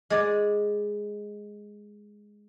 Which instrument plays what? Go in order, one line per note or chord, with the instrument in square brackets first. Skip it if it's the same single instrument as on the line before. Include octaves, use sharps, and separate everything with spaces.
[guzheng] G#3 D5